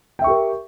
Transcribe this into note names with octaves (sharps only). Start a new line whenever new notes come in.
G4 A#4 E5 G5 C#6